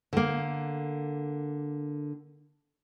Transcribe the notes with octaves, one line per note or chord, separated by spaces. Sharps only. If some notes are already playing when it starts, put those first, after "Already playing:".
D3 A#3